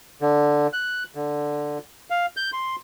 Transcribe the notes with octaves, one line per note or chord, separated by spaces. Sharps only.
D3
F#6
D3
F5
G6
C6